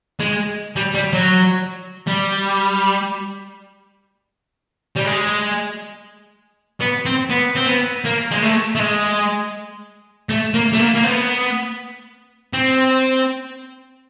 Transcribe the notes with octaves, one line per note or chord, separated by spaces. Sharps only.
G#3
G3
G3
F#3
G3
G3
G#3
B3
C4
B3
C4
B3
A#3
G#3
A3
A3
G#3
A3
A#3
A3
A#3
A#3
B3
C4